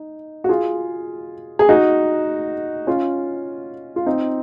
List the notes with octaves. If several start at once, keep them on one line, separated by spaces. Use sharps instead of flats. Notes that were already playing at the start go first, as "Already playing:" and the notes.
Already playing: D#4
F#4
F4 G#4
G#4
D#4 F#4
C#4 F4
F4
C4 D#4